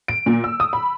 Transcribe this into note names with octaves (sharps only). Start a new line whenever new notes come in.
D7
A#2
E6
D#6
B5